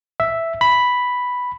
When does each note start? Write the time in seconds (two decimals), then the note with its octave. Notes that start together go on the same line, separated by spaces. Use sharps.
0.20 E5
0.61 B5